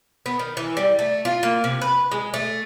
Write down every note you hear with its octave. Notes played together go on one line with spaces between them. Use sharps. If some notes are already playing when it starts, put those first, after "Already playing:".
B3
D#3
E3
G3
A3
F4
A#3
C3
B4
G#3
A3